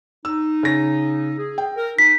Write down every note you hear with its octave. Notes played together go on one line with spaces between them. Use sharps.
D#4 E6
C#3 A#6
G#4
G5
A#4
D#4 B6